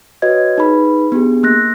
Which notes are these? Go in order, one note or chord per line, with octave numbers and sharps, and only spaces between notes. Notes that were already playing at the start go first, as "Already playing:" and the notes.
F#4 B4 C#5 D#5 G#6
D#4 G#4 B4 B5
B3 D4 G4 G#4
A#3 F#6 A#6